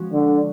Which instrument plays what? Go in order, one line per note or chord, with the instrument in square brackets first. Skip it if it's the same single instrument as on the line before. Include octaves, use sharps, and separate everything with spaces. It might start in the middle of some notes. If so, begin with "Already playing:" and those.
Already playing: [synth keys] F3 G#3 C#4 F#4
[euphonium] D3